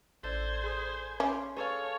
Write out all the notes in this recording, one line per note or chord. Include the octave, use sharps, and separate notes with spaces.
A1 A4 C5 D5 E6 G#6
G#4 B5 D#6
C#4 B5 C6 D6
G#4 A4 B4 C#5 F5 A5 C#6